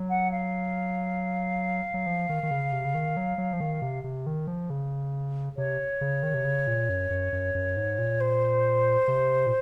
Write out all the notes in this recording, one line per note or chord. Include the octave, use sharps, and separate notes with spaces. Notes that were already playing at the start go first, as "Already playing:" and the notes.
Already playing: F#3
F#5
F5
F#3
F3
D#3
D#3
C#3
C3
C#3
D#3
F#3
F#3
F3
D#3
C3
C3
D#3
F3
C#3
C3 C#5
C#3
D#3
C3
C#3
A#2
F#2
F#2
F#2
F#2
G#2
A#2
C5
C3
A#2